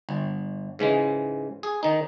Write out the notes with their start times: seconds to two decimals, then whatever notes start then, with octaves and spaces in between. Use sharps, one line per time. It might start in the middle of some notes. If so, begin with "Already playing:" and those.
0.09 G1
0.79 G#2 C#3 E3 G#3
1.63 G#4
1.83 D#3 D#4